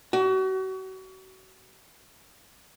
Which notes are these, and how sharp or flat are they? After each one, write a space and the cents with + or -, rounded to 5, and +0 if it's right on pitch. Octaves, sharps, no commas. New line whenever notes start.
F#4 +35